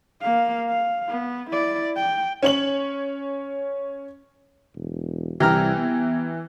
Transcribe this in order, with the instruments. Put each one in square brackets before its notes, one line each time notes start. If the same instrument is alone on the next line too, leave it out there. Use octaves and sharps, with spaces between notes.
[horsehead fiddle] A#3 F5
F5
B3
E4 D5
G5
[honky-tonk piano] C#4 C#5 F#7
[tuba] E1
[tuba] C2 [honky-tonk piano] E3 [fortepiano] G4 A#5 F6
[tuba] B3